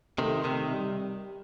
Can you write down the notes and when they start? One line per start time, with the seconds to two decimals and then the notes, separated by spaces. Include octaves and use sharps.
0.18 C3 D#3 A3
0.44 C3 D#3
0.71 G3